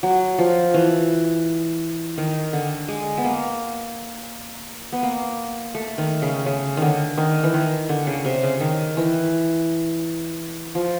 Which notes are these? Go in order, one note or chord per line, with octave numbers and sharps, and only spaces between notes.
F#3
F3
E3
D#3
D3
G#3
B3
A#3
B3
A#3
A3
D#3
C#3
C#3
D3 D#3
D#3
E3
D#3
D3
C#3
C3
C#3
D#3
E3
F3